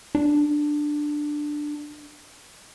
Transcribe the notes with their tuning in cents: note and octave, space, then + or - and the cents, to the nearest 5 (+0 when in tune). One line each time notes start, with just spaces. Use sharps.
D4 +10